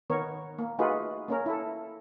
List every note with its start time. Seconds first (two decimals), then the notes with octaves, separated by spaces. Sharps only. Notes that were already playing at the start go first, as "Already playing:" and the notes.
0.10 D#3 B3 A#4 C#5
0.59 A#3
0.79 A3 D#4 F4 F#4 G#4 B4
1.28 A#3 C#4 A#4
1.46 E4 A4